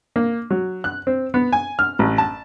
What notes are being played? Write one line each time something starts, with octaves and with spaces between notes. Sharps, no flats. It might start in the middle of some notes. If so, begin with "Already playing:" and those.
A#3
F#3
F#6
C4
B3
G#5
F6
A1
A5